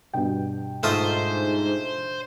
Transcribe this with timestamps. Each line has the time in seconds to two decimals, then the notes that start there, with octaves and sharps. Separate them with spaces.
0.13 G2 B2 G5
0.83 G#2 A3 F4 C5 D#5